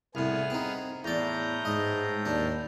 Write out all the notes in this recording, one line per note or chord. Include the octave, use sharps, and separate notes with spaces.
C2 A2 B3 G#4 F6
C4 D#4
E2 A2 D5 A#5 G6
G#2 D#5
D#2 D4